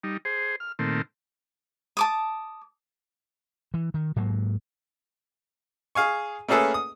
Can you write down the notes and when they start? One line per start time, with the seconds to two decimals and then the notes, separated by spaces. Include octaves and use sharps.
0.04 G3 D#4
0.25 G#4 C5
0.60 F6
0.79 A#2 D#3 A3 C4
1.97 A5 D6 D#6
3.74 E3
3.94 D#3
4.16 G#2 F#3 A#3
5.95 G#4 F5 G#5 C#6
6.48 A3 A#3 C#4 G#4 A4 B4
6.74 D#6